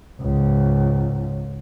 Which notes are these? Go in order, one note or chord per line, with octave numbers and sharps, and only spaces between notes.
C#2 G#2